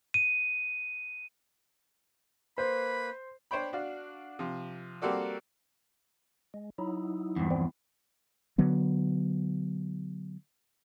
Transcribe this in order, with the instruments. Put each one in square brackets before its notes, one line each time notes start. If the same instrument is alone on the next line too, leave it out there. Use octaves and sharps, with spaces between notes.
[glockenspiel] D#7
[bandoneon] A#3 B4 [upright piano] C5 [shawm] B5
[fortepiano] D4 C5 C#5 G5 B5
D4 F#4 D5 F5
C3 F3
G3 A#3 C4 F#4 A4 D5
[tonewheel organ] G#3
F#3 D#4 E4
[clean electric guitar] E2 G2
[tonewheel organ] F3 G3 C4
[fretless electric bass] D3 F#3 B3